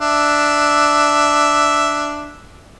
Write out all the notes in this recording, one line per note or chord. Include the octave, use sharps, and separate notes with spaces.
D4 E5